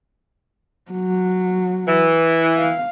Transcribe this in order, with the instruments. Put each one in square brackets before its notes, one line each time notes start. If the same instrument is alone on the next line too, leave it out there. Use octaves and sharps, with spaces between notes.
[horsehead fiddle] F#3
[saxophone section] E3
[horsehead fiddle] F5